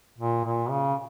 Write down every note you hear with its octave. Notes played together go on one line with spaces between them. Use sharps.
A#2
A#2
C#3